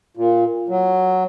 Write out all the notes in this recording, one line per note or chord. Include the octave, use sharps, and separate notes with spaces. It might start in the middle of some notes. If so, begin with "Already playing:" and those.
A#2
F#3